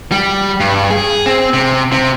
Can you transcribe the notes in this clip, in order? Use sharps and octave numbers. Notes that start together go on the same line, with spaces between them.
G3
G2
G#4
C4
C3
C3